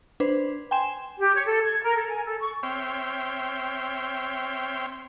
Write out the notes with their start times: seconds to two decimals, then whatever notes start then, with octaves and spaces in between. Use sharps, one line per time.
0.20 D4 B4 C5
0.71 G5 G#5 C6 E7
1.18 G4
1.34 C#5
1.46 A4
1.64 G#6
1.83 A#4
1.96 A4
2.09 G#5
2.25 A4
2.39 C#6
2.63 C4 C#5 E5 G5 C6 F6